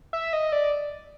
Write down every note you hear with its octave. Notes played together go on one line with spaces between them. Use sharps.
E5
D#5
D5